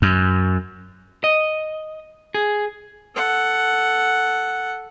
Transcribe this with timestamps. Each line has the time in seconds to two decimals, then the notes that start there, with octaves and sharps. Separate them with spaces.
0.02 F#2
1.24 D#5
2.34 G#4
3.16 A4 F#5